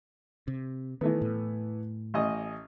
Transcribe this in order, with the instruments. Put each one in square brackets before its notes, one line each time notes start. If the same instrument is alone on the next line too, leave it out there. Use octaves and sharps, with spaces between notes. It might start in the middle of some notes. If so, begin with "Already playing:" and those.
[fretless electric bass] C3
[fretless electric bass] D#3 [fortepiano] E3 A3 B3
[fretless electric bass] A2
[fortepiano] A1 D#5 D#6